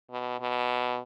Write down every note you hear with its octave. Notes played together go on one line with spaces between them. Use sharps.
B2
B2